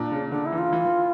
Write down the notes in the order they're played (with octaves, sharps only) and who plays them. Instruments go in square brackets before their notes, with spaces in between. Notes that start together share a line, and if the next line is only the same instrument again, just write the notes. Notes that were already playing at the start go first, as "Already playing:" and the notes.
Already playing: [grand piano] A#2 [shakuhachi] D4
[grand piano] C#3
[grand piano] D3 [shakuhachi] D4
[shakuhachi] E4
[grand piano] E3
[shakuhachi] F4
[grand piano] E3
E3